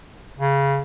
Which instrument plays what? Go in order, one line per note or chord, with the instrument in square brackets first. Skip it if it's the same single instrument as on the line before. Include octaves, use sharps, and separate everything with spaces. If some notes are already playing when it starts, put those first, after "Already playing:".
[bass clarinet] C#3